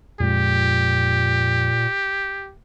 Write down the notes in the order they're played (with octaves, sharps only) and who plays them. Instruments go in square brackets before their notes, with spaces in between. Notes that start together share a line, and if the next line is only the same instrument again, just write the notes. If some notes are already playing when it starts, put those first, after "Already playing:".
[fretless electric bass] F2 G#3 [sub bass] A#2 [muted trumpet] G4